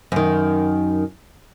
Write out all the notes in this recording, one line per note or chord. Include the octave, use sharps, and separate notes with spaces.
F#2 D#3